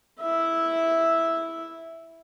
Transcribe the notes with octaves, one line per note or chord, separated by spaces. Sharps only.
E4 E5